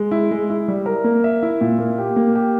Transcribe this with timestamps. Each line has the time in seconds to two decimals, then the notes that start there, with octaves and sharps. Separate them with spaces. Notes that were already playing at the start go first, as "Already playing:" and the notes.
Already playing: G#3
0.11 E4
0.31 G#3
0.50 E4
0.68 G3
0.86 A#4
1.04 A#3
1.24 E5
1.43 E4
1.61 A#2
1.79 A#3
1.98 G4
2.16 A#3
2.35 G4